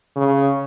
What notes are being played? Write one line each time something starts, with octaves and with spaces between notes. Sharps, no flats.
C#3